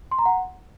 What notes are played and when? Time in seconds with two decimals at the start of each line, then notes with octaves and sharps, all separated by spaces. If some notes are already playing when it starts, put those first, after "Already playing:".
0.11 C6
0.19 A#5
0.26 F#5